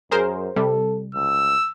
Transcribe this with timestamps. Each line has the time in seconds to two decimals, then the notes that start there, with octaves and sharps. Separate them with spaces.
0.11 F#2 G#4 A#4 C5
0.56 C3 G3 A4
1.15 C#2 E6